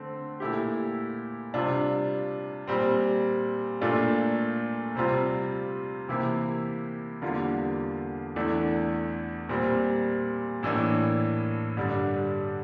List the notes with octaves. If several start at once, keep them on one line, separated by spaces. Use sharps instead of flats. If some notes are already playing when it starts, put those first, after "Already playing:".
Already playing: D3 A3 C4
A#2 A3 E4 G4
C3 G3 D4 F4
A#2 G3 C4
A#2 A3 D4 F4
C3 G3 C4 F4
C3 E3 A#3 E4 G4
E2 D3 G3 A#3 F4
E2 E3 A3 D4
A#2 G3 C4
A2 E3 A#3 D4
G2 D3 G3 D4